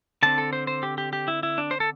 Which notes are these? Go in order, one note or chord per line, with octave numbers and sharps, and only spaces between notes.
D3 C4 A5
A4
C5
C5
G4
G4
G4
E4
E4
D4
C5
A4